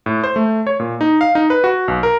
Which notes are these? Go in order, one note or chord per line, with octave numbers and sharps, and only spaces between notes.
A2
C5
A3
C#5
A#2
D#4
F5
D#4
B4
F#4
B1
A#4